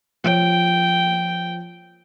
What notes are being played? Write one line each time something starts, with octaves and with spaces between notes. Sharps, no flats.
F3 C#5 G5 D7